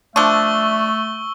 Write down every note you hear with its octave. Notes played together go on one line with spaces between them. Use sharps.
F3 A3 D4 E5 C#6 E6 G7